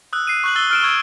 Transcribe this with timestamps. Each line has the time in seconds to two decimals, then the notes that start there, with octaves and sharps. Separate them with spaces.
0.13 D#6 E6 F#6
0.27 C7 D#7
0.44 C#6 F#6 F#7
0.55 C#6 D#6 E6 A6 F#7 G7
0.70 F6 D7 E7
0.83 C#6 E6 G#6